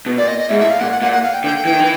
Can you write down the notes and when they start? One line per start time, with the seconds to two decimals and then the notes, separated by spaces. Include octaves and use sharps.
0.06 B2
0.17 A#2 D5
0.28 D#5
0.39 D#5
0.49 G#2 E5
0.60 A2 E5
0.70 F5
0.80 A#2 F#5
0.91 F#5
1.02 A#2 F#5
1.12 F#5
1.23 F5
1.33 G5
1.44 D3 G5
1.65 E3
1.72 D#3
1.80 E3